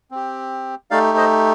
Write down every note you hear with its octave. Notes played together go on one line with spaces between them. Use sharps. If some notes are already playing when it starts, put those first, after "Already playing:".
C4 G4
A3 D#4 G4 D5 F5
C5 D#5